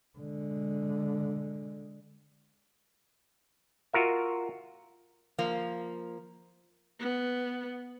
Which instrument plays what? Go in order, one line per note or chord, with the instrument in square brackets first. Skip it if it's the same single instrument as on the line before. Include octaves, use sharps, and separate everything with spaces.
[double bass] D3 G#3
[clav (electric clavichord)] F4 F#4 A#4 E5
[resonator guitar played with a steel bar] F3 A#3
[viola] B3